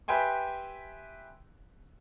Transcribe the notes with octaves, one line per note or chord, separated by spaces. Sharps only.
G4 B4 E5 G5 G#5 C6